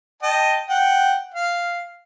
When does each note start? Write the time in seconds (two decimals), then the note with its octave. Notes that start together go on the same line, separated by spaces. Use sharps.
0.23 D#5 G5 A5
0.69 F#5 G5
1.34 F5